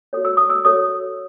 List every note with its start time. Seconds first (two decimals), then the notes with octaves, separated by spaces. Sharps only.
0.13 F#4 A4 C#5
0.25 E6
0.37 D#6
0.50 E6
0.65 F#4 A4 C#5 D#6